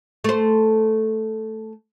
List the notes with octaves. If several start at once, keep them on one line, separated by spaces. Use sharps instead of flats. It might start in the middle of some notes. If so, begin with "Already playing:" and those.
A3 C5